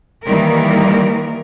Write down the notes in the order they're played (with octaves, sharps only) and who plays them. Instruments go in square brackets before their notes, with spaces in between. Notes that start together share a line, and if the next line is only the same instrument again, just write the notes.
[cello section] D#3 E3 G3 A#3 A#4